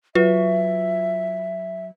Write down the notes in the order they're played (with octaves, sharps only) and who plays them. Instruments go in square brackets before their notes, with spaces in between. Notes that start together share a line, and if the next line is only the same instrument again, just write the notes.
[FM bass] F#3 [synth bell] F4 [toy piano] B4 [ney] E5